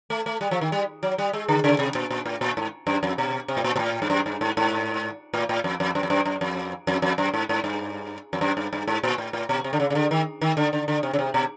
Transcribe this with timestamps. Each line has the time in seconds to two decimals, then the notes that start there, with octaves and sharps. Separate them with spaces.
0.10 A3
0.26 A3
0.41 G3
0.51 F3
0.61 D#3
0.72 G3
1.03 F#3
1.18 G3
1.33 G#3
1.48 D3
1.64 C#3
1.79 C3
1.95 A#2
2.11 A#2
2.26 A2
2.41 A#2
2.57 G#2
2.87 F#2
3.03 F2
3.18 B2
3.48 C3
3.57 A2
3.64 A#2
3.76 A#2
3.79 A2
4.02 G2
4.10 F#2
4.26 G2
4.41 G#2
4.57 G#2
5.34 A2
5.49 A2
5.64 F2
5.80 F2
5.95 F#2
6.03 F2
6.10 F#2
6.26 F#2
6.41 F2
6.87 F2
7.02 F2
7.18 F#2
7.34 G#2
7.49 G#2
7.64 G2
8.33 F2
8.41 F#2
8.57 G2
8.73 G2
8.88 G#2
9.03 A#2
9.18 A2
9.33 A2
9.49 B2
9.64 C3
9.73 D3
9.80 C#3
9.90 C#3
9.95 D3
10.11 D#3
10.41 D#3
10.57 D3
10.73 D3
10.88 D3
11.03 C3
11.13 C#3
11.19 C3
11.34 B2